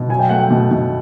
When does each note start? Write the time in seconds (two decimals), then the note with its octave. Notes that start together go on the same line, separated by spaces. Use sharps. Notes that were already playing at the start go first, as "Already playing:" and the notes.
Already playing: B2
0.09 F#3 G#5
0.19 G5
0.29 A3 F#5
0.39 G5
0.50 B2
0.71 B2